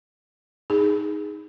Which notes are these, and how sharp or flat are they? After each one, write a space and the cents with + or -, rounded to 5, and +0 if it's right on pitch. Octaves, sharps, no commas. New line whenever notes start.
D#4 +0 G#4 -10